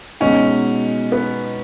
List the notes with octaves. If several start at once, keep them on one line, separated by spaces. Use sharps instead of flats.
B2 G#3 C#4 D#4 F#4
B3